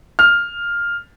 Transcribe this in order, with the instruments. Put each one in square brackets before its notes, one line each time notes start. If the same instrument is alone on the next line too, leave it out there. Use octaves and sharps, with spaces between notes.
[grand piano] F6